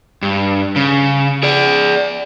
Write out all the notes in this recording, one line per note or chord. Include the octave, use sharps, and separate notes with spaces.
G2
C#3
G#4 D5